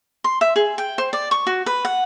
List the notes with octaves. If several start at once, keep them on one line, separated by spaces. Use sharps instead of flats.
C6
E5
G#4
G5
C5
D5
C#6
F#4
B4
F#5